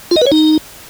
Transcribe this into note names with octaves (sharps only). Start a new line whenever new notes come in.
F4
D#5
B4
C#5
D#4